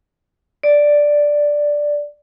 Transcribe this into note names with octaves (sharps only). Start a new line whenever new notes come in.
D5